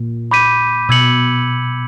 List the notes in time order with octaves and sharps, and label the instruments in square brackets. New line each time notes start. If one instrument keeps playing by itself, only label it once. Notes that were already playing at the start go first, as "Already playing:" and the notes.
Already playing: [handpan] A#2
[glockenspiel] B5 D6 G6 B6 D#7
[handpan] B2 [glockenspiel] E6 G#6 C#7 F#7